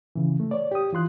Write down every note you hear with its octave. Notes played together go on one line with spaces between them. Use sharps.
C#3 E3
A3
C#5 D5
G4 D#6
E3 F4 C6 F#6